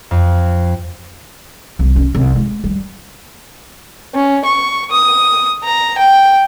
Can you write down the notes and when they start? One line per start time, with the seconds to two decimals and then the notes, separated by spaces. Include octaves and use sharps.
0.11 F2
1.79 C2
1.96 C#4
2.15 C2
2.35 G#3
2.64 G3
4.14 C#4
4.45 C#6
4.91 D#6
5.64 A#5
5.98 G5